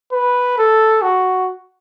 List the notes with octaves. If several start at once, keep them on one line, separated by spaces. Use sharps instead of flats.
B4
A4
F#4